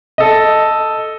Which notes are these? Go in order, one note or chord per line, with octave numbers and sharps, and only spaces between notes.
A4 D#5